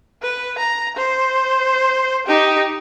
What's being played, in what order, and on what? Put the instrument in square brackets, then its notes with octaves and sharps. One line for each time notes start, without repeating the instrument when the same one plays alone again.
[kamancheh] B4
A#5
C5
D#4 G4